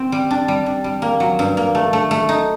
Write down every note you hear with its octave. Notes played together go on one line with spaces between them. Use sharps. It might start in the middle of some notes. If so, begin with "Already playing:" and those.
Already playing: C4
G3
D4
G3
D4
G3
A#3
F#3
G2
A#3
A3
A3
A3
D#4